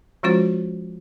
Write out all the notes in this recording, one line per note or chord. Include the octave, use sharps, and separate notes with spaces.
F3 G#3 C#4 F4 F#4 C5